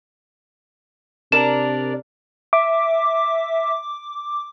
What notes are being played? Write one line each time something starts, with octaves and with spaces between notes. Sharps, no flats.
C3 D4 A#4 D5 E7
E5 D6